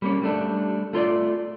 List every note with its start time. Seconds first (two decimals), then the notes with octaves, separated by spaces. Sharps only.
0.02 G3 A#3 C#4
0.22 G3 A3 D4
0.93 A3 F4 C#5 D5